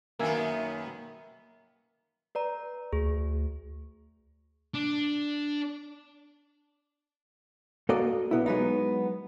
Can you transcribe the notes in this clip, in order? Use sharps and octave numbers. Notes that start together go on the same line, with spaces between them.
F#2 D#3 A#3 B3 E5 G#5
B4 D5 A#5
D2 G#4
D4
A#3 F#4 A4 D5 D#5
B1 B3 E4
F#3 G#3 B3 D#4